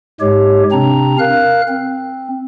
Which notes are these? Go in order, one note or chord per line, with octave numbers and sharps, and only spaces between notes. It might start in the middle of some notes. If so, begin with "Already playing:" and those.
G#2 G#3 G4 C#5
C3 C4 D4 A#5
A#4 F5 F#6
C4